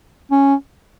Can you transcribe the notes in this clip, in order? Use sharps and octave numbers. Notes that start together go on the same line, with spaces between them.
C#4